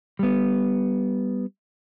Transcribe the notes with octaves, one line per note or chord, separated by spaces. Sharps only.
G3 B3